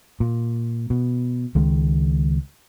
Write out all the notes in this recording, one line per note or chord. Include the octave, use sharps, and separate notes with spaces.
A#2
B2
C#2 D#3 G#3